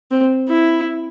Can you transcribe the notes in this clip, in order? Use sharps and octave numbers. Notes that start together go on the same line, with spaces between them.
C4
E4